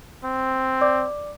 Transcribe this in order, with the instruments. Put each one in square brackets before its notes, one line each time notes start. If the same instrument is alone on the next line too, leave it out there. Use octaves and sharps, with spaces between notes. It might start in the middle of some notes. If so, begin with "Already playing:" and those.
[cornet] C4
[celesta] D5 D6